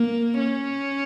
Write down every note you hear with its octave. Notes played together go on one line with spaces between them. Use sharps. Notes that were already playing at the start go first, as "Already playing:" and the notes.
Already playing: A#3
C#4